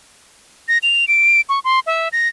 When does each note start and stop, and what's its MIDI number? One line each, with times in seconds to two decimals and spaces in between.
0.68 0.78 94
0.83 1.07 101
1.08 1.41 98
1.49 1.59 85
1.64 1.80 84
1.87 2.09 76
2.13 2.28 94